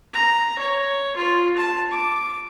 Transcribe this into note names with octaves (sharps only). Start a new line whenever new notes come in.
A#5
C#5
F4
A5
D6